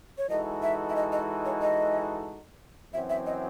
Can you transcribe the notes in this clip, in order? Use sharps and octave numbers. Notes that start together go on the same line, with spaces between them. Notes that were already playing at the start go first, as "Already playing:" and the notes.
C#5
E3 G#3 D#4 F#4 A4 D#5
E5
E5
D#5
D#5
C#5
D#5
F#2 E3 C4 F#4 E5
E5
D#5